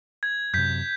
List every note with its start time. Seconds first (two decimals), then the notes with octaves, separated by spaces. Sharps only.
0.23 G#6
0.54 F#2 C3 G6 B6